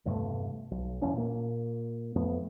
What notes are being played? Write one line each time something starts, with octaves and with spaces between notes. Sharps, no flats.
E1 G2 C3 A3
B1
F#1 E2 C#4 D4
A#2 A#3
F2 A3 B3